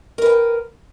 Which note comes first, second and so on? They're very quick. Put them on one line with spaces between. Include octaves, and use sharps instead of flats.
A#4 B4 G5